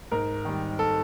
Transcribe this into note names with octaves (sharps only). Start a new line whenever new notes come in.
G#2 A#4
D#3 G3
A4